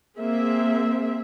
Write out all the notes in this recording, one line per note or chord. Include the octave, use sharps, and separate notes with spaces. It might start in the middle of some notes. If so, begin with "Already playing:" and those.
A#3 C4 G#4 E5